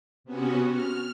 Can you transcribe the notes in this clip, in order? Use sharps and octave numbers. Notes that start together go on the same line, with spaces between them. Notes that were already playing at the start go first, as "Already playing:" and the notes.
C3 B3 C#4 F#4
F6